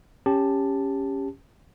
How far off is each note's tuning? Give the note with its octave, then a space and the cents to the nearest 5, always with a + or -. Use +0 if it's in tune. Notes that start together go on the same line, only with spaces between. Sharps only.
C#4 +0 G4 +15 A5 +0